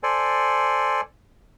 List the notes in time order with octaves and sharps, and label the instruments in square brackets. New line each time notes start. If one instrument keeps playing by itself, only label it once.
[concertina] A4 C5 D5 G#5